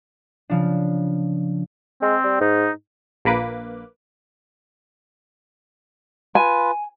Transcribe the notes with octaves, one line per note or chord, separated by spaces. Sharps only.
C#3 F3 D4
G#3 C4
G3
G#2 D#4
A#1 A#3 B4 D6
F4 B4 G#5